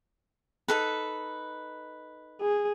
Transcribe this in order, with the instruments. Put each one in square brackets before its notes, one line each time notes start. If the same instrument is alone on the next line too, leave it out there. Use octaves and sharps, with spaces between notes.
[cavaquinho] D#4 A4 B4
[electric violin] G#4